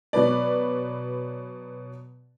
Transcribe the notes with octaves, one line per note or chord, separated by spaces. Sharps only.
B2 F#3 B4 D5